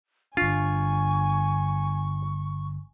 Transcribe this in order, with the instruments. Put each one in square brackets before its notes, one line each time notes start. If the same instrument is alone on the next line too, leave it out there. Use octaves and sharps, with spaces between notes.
[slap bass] G1 D4 [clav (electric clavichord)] F4 [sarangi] G#5 [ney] C#6